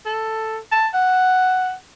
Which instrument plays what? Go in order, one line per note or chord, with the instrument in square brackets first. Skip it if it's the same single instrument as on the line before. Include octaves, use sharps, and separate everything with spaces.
[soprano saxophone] A4
A5
F#5